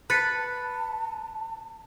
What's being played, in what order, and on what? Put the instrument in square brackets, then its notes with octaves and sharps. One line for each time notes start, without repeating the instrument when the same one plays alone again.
[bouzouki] B4 [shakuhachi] A5 [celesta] F#6 A6 C#7